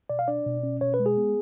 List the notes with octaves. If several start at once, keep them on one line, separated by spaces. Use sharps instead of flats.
B2 D5
F5
D4 D5
B2
C#4
B2 C#5
B4
G#3
G#4
B3